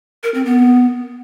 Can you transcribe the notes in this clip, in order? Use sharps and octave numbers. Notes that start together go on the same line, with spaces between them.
A#4
C4
B3